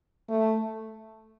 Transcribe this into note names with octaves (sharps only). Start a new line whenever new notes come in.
A3